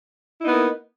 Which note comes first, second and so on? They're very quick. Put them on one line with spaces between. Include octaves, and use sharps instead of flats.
E4 D#4 B3 A#3